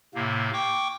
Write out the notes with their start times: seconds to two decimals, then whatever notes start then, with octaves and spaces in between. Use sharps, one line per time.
0.15 A2 C3 A#3
0.53 G5 C#6 D6